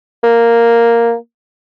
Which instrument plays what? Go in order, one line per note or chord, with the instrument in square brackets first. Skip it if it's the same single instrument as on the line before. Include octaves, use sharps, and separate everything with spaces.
[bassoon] A#3